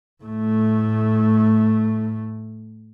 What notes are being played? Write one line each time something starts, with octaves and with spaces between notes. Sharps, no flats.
A2 A3